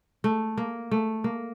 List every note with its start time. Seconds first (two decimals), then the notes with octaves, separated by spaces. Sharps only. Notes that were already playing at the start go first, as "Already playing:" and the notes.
0.24 A3
0.58 A#3
0.91 A3
1.24 A#3